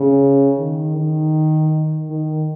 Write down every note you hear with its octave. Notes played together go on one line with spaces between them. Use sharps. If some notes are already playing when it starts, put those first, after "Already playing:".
Already playing: C#3
D#3
D#3
D#3